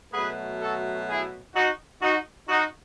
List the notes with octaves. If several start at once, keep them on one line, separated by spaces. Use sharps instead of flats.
B2 F#3 A3 G#4 B4
F#4 A4
E4 G#4
D#4 F#4
D#4 F#4
D#4 F#4